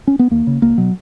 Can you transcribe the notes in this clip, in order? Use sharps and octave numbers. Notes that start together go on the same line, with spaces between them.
C#4
B3
D#2 A#3
C#3
C#2 A#3
B2 F#3